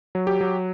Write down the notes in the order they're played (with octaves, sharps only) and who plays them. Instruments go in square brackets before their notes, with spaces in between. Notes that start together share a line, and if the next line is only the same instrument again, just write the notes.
[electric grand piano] F#3
G4
F#3